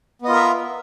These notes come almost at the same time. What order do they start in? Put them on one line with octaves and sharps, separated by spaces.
B3 D#5 F4 A#4 E5